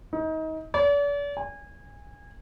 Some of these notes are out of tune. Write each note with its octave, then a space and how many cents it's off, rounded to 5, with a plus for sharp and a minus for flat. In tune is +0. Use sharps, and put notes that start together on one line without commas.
D#4 +30
D5 -40
G#5 -25